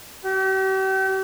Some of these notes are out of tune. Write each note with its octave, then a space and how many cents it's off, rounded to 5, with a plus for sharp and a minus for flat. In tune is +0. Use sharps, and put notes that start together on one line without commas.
G4 -40